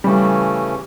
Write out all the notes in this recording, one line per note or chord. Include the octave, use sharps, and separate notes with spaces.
C#3 E3 G3 A3 C#4